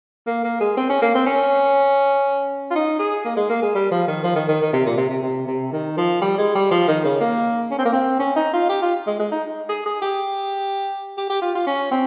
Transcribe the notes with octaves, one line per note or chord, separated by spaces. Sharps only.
A#3
A#3
G#3
C4
C#4
A#3
C4
C#4
F4
D#4
G#4
A#3
G#3
A#3
G#3
G3
F3
D#3
F3
D#3
D#3
D#3
C3
A#2
C3
C3
C3
C3
D#3
F3
G3
G#3
G3
F3
D#3
C#3
A#3
C#4
C4
A#3
C4
C#4
D#4
F4
G4
F4
G#3
G#3
D#4
G#4
G#4
G4
G4
G4
F4
F4
C#4
C4